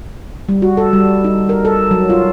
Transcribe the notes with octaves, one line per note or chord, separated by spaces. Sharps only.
G3
F#4
A4
G3
D#4
A#4
A4
F#3
F4